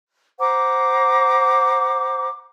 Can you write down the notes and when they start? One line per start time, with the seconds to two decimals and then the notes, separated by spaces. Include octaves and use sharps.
0.40 C5 F#5 A#5 D6